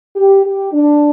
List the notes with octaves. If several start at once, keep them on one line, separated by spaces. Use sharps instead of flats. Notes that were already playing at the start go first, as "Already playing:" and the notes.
G4
G4
D4